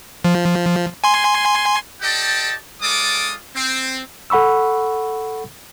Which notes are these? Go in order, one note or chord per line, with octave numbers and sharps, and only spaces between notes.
F3
G#5 C6
G4 A4 D5 D#5 G5 A5
G#3 F4 A4 D5 D6 D#6
C4
A4 F#5 B5 C#6 E6